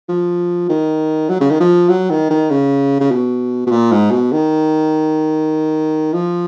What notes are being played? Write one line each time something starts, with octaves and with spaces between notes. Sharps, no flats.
F3
D#3
F#3
C#3
D#3
F3
F#3
D#3
D#3
C#3
C#3
B2
B2
A#2
G#2
B2
D#3
F3